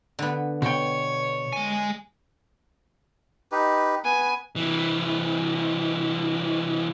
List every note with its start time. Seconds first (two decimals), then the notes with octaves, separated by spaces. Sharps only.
0.19 D3 B3
0.62 B2 C#5 G5
1.53 G#3 G#5
3.52 D#4 G4 B4
4.05 B3 B4 G#5
4.56 C2 E3